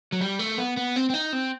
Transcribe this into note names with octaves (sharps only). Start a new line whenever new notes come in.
F#3
G3
A3
B3
B3
C4
C4
D#4
C4